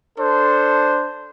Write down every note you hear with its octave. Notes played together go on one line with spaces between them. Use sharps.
D4 A4 C5